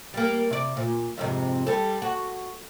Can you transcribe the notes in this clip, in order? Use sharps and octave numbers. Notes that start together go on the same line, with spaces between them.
G3 A#3
C3 D5
A#2
F2 G#2 C3
G3 A4
F#4